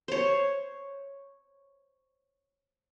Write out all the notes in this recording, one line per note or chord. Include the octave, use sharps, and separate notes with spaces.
C5 C#5